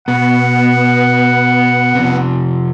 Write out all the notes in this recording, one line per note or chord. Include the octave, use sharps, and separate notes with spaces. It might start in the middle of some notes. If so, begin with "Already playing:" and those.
B2 B3 F#5
F2 C3